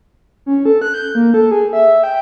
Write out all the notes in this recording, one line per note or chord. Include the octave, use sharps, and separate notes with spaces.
C#4
A4
F#6
G6
A#3
A4
G#4
E5
G5